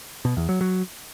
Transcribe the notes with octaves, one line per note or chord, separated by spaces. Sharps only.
B2
E2
F#3
F#3